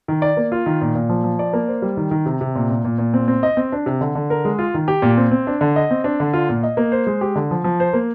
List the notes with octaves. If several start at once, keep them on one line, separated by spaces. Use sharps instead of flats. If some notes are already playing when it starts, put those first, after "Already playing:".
D#3
D5
A#3
F4
D#3
A#2
A#2
F3
F3
D5
A#3
C5
G3
D#3
D#3
C3
C3
A#2
A#2
A#2
A#2
C4
C4
D#5
C4
D4
C3
D3
D3
A#4
G#3
F4
D#3
G4
A#2
C4
C4
D4
D3
D#5
C4
D4
D3
F4
A#2
D#5
A#3
C5
G#3
G4
D3
F3
F3
C5
A#3